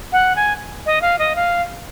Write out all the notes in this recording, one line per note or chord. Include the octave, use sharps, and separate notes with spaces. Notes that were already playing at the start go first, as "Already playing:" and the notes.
F#5
G#5
D#5
F5
D#5
F5